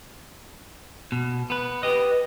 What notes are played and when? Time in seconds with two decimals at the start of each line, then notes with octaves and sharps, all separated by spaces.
1.12 B2
1.50 B3 B4
1.83 G4 B4 D#5